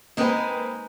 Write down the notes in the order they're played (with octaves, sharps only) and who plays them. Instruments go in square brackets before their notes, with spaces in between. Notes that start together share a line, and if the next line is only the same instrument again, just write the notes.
[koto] G#3 D#4 [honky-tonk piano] A#3 C4 B4